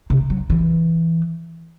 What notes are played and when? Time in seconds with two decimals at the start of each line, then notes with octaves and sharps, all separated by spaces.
0.10 C3
0.30 F#3
0.50 E3